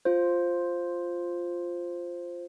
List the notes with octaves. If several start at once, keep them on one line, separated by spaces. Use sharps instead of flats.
F4 C5